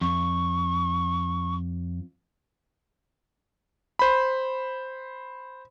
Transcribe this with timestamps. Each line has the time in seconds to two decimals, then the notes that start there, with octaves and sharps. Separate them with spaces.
0.01 F2 C#6
3.99 C5 B5